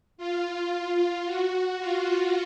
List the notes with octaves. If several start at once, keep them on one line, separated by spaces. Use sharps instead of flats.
F4
F4
F#4
F4